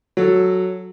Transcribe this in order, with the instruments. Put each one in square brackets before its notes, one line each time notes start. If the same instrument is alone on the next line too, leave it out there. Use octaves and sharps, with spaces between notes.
[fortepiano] F#3 A4